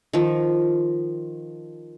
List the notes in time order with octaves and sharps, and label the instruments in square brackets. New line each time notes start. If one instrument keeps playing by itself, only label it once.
[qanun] D#3 F3